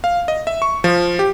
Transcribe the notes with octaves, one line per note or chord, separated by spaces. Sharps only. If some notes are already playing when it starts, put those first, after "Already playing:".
F5
D#5
E5
C#6
F3
G4